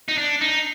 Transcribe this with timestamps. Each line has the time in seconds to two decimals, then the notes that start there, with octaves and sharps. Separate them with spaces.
0.08 D#4
0.18 D4
0.41 D#4